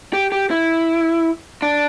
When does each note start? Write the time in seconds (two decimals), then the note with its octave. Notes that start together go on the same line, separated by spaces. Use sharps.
0.13 G4
0.32 G4
0.51 E4
1.62 D4